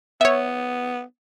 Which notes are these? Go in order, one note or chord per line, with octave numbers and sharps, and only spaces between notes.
B3 C#5 E5